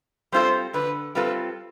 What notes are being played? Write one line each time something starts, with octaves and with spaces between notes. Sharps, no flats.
G3 C4 F4 A4 C5
D3 B4
G3 C4 F4 A4 B4